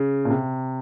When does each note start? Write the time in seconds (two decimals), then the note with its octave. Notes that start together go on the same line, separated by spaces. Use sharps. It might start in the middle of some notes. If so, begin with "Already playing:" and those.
Already playing: C#3
0.25 A#2
0.30 C3